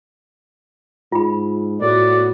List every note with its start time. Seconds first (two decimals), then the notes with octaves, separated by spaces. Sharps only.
1.12 G#2 F4 B5
1.81 A2 B3 F#4 D5